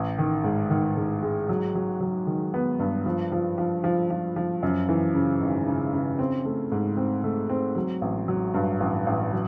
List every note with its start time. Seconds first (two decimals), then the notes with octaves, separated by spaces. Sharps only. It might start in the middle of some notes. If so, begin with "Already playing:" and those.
Already playing: A1
0.18 D#3
0.44 G#2
0.70 D#3
0.97 G#2
1.22 G#3
1.49 F#3
1.75 F#3
2.01 F#3
2.27 D#3
2.54 B3
2.79 G2
3.06 F3
3.32 F3
3.58 F3
3.84 F3
4.10 F3
4.36 F3
4.63 F#2
4.89 E3
5.14 C#3
5.40 G#1
5.67 C#3
5.93 C#3
6.19 C4
6.45 A3
6.72 G#2
6.97 C4
7.24 A3
7.50 C4
7.76 F#3
8.01 A1
8.28 F#3
8.54 G2
8.80 A1
9.07 A1
9.32 F#3